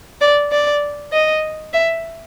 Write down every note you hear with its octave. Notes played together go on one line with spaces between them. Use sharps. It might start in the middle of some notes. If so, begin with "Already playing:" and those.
D5
D5
D#5
E5